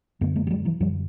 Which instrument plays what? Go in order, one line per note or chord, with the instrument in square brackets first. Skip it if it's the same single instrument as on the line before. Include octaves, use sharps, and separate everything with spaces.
[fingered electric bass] F#2 D3 A3 B3
G#3 A#3
G3
F#3 G#3
E3 F#3
F#2 D3 F3 G3